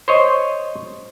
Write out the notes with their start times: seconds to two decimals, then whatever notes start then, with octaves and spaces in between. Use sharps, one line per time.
0.08 C5 C#5 D#5